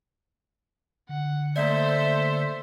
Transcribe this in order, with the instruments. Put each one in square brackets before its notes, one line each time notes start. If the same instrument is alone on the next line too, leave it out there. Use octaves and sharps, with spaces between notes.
[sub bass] D3 [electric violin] F#5
[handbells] A3 A#3 D5 [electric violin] A4 C5 [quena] E5